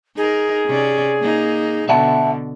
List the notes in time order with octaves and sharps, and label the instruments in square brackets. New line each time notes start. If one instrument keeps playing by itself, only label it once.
[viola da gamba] D#4 A#4 [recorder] G#4
[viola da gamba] C3 C#4 D5
A#3 D#4
[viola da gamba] B2 D3 [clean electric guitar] E5 F#5 A5